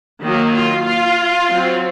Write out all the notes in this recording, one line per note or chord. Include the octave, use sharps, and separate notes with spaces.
D#3 F#3 A#3
F4
F4
F#3 C4